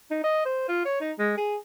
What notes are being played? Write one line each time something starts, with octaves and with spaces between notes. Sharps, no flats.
D#4
D#5
C5
F4
C#5
D#4
G#3
G#4